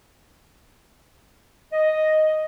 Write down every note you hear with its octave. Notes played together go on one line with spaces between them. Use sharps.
D#5